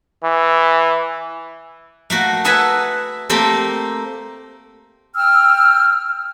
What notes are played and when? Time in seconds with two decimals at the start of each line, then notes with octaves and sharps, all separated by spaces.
0.24 E3
2.10 A3 A#3 F#4
2.45 G#4 A4 B4 E5 F#5 G#5
3.30 A3 A#3 C4 G4 A4
5.15 G5 E6 F6